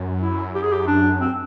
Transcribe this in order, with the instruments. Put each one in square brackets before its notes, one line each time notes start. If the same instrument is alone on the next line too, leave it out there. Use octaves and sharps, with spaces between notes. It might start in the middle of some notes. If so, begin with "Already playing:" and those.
Already playing: [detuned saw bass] F#2
[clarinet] E4
G4
G#4
G4
D4
C4